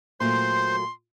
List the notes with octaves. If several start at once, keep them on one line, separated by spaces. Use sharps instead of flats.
A#2 F#3 A3 C5 C6